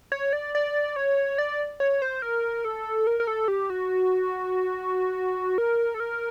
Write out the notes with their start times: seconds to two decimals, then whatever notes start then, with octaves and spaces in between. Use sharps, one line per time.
0.12 C#5
0.33 D5
0.55 D5
0.96 C#5
1.38 D5
1.80 C#5
2.02 C5
2.22 A#4
2.65 A4
3.07 A#4
3.20 A#4
3.27 A4
3.48 G4
3.70 F#4
5.58 A#4
5.94 A4
6.00 A#4